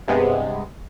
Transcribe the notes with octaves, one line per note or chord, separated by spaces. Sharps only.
G2 C3 G#3 B3